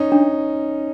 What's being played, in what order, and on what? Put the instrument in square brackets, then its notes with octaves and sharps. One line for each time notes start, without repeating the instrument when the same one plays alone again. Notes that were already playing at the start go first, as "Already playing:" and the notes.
Already playing: [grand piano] C#4 D#4
[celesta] D4